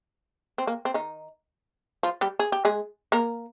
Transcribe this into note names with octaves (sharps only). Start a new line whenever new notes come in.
C4
A#3
C4
D#3 D#4
F3 F4
G3 G4
G#4
G4
G#3 G#4
A#3 A#4